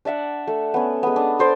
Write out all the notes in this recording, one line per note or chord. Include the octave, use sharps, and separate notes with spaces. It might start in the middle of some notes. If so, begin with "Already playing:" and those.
D4 D5 E5 F#5
A3
B3 C#4
G#3 B3
D4
A4 C5 D5